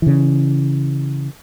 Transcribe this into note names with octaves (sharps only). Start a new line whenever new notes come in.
C#3 E3